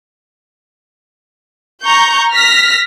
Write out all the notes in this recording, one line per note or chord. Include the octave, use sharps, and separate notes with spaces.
A#5 C#6 G6
F6 A#6 B6